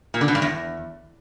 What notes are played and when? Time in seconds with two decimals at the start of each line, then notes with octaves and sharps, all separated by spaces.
0.14 A#2
0.21 D3
0.28 B2
0.35 G2
0.42 E2